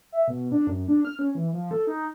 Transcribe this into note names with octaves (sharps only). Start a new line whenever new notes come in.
E5
B2
D4
F#2
D4
F6
C#4
E3
F3
A4
D#4